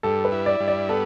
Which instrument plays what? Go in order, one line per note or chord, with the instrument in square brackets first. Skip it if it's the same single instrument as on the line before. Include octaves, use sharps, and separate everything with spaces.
[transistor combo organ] G2 [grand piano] A4
[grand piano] B4
[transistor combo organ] E4
[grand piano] D5
[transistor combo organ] G2
[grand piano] D5
[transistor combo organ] B3 [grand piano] A4